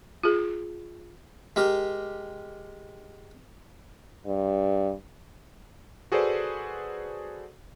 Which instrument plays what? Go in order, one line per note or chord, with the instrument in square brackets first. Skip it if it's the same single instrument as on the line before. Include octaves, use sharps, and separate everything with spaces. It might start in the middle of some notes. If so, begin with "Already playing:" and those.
[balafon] F4 G#4
[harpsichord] G#3 G4 A#4
[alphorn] G2
[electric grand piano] F#4 G#4 A4 B4 C5 D5